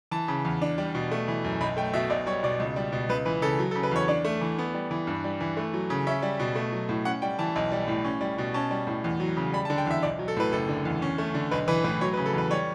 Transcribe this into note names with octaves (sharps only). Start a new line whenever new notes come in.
E3 A5
C#3
E2
D4
G3
B2
A3
E3
F#2
B1 B5
A3 G5
B2 E5
B1 D5
G3 C#5
B2 D5
C#2
G3
B2
C#2 B4
E3 B4
C#3 A4
F#3
A4
C#3
B4
E2 C#5
D4 D5
A3
E3
B3
G3
E3
G2
G3
E3
A3
F#3
C#3
C#4 E5
G3
B2
A3
F#3
A2
C#4 F#5
G3 G5
E3 A5
B1
G3
A2
C#4
G3
B2
C#4 A5
G3
A2
E2
F#3
C#3
G3 B5
A5
D3
G5
E2 E5
B1 D5
F#3
A4
A2 B4
F#1 A4
D3
E2
C#4
A3
D3
B1 B4
E3 B4
A2 B4
F#3 C#5
B4
C#3
A4
E2 B4
G3 C#5